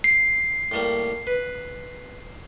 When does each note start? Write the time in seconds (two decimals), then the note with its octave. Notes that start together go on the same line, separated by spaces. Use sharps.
0.04 C7
0.71 A2 G3 A#3
1.27 B4